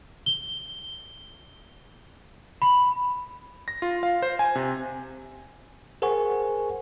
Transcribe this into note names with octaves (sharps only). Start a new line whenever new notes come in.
G7
B5
A#6
F4
F5
C5
G#5
C3
G#4 A#4 C5 F#5 G#5 C#6